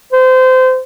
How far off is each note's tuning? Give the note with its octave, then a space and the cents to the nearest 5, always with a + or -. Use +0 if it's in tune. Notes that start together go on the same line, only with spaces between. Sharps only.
C5 -25